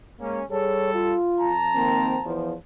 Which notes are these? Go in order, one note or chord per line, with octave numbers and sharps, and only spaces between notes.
G#3 A#3 C#4
G3 G#4 A4 C#5
F4
F2 A5 A#5
D#3 A#3 C4
E2 F3